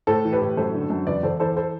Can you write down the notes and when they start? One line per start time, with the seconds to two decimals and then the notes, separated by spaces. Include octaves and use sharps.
0.07 A2 A4 C5
0.25 E3
0.32 G4 B4
0.41 A2
0.57 F#2 A4 C5
0.74 D3
0.90 F#2
1.07 E2 B4 D5
1.23 E2 A4 C5
1.40 E3 A4 C5
1.57 A4 C5